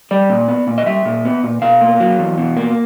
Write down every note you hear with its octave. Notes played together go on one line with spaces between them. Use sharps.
G3 D5
A#2
B3
A#2
D#5
G3 E5
A#2
B3
A#2
B2 F5
A#3
F#3
E2
B2
A#3